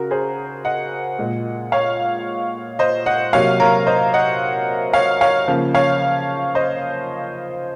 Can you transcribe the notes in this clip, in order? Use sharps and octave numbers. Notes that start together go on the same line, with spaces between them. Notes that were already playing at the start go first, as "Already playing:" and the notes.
Already playing: C#3 F#4 A#4
G#4 C5
D#5 F#5
A#2 G#3
C#5 F5
C5 D#5
D#5 F#5
C3 F#3 A#3 C#5 F5
A#4 C#5
C5 D#5
D#5 F#5
C#5 F5
C#5 F5
C#3 F3 A#3
C#5 F5
C5 D#5